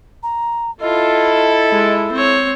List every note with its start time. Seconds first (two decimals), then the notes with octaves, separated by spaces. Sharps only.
0.23 A#5
0.81 E4 F4 A4 D#5
1.71 G#3
2.12 C4 C#5